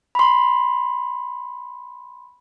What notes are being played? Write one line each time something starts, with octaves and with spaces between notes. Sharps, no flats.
B5 C6